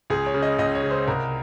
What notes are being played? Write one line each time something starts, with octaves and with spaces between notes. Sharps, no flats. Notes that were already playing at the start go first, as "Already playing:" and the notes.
C#2 G#4
C#5
C#3
D#5
C#2 D#5
C#5
C#3
C5
C2 A#4